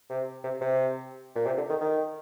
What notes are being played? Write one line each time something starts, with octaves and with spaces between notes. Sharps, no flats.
C3
C3
C3
A#2
C3
D3
D#3
D#3